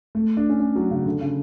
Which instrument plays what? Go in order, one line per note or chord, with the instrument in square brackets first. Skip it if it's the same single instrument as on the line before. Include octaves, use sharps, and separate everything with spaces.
[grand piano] A3
D4
C#4
C#4
F#3
C#3
D3
C#3